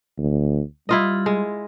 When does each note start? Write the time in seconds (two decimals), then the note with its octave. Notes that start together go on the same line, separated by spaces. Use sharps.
0.18 D2
0.89 G3 E4 F4 D#5
1.26 G#3